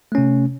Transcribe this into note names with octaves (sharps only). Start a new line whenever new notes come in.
C3 A3 C#4